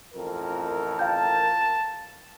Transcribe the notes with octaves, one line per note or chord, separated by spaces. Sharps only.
A1 F2 A#4
F5 G5 A5 G6